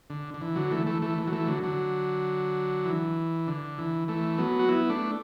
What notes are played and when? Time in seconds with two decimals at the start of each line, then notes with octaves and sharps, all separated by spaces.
0.10 D3
0.34 D3
0.41 E3
0.56 D3 F#3
0.71 E3 A3
0.86 E3 A3
1.02 E3 A3
1.18 E3
1.27 F#3
1.32 E3 A3
1.48 D3 F#3
1.63 D3 F#3
2.85 E3
3.47 D3
3.78 E3
4.08 E3 A3
4.38 F#3 B3
4.59 F#4
4.69 B3 E4
4.90 A3 D4